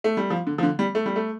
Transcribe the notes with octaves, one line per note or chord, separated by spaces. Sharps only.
A3
G3
F3
D3
F3
D3
G3
A3
G3
A3